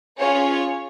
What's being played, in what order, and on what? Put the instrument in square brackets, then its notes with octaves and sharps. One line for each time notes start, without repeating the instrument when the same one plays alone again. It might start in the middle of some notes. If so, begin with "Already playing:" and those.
[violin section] C#4 F4 G#4 C#5